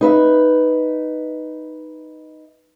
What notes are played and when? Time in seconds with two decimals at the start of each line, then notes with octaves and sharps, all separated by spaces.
0.01 D#4 B4 E5